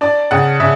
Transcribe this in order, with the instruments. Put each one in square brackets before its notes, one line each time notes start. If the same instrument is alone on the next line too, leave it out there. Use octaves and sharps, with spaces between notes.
[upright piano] D4 D5
C#3 F#5
C#3 E5